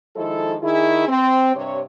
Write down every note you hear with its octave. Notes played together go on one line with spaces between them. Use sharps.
D#3 F3 G#3 E4 A4
D#3 E4 G#4
C4
G2 C3 C#5